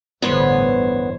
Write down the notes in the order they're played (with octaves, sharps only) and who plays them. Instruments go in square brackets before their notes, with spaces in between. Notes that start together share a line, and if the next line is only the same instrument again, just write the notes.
[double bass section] A1 G2 D3 [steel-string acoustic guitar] E2 C5 C#5 [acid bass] B3